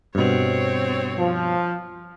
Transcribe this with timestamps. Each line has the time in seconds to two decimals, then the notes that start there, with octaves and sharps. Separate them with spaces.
0.15 G2 B2 C4 C#5
1.18 F3